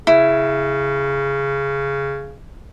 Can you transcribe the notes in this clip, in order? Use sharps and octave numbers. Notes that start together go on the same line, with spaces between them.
C#3 E4